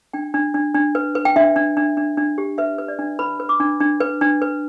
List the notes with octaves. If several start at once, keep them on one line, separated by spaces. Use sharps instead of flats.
D4 G5
D4
D4
D4
B4
B4
G5
D4 E5
D4
D4
D4
D4
G4
B4 E5
B4
D5
D4
B4 B5
B4
D6
D4
D4
B4
D4
B4